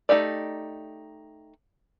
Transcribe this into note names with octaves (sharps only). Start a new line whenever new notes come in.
A3 D#4 G4 D5